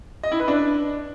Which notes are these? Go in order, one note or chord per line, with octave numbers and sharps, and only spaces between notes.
D#5
E4
B4
D4